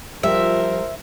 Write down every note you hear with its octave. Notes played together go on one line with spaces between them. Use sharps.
F3 G3 F4 A#4 C5 E5